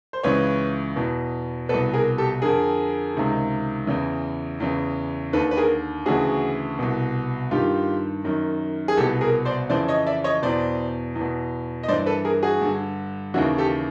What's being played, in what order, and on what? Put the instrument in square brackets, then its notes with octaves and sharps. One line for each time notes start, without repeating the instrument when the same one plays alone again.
[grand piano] C5
C#2 C#3 E3 B4 C#5
E2 B2
B2 A4 B4
C2
G#4 A#4
G4 A4
F2 D3 G#4 A#4
C#2 C3 D#3
E2 C#3 E3
E2 C#3 E3
D#2 D3 A4 B4
B4
G#4 A#4
D2 C#3 E3 F#4 G#4
C2 B2
G2 D#3 F4 G4
F#2 D#3
G#4
C2 G4 A4
B2
G#4 A#4
C5 D5
F2 C#3 E3 C5 D5
C#5 D#5
D5 E5
C#5 D#5
E2 B2 C5 D5
E2
B2
D#5
G2 C5 D5
E3
A4 B4
G#4 A#4
F#4 G#4
G2 D3
D#2 C#3 E3 E4 F#4
G4 A4